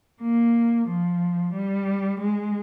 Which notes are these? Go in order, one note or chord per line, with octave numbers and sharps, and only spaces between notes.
A#3
F3
G3
G#3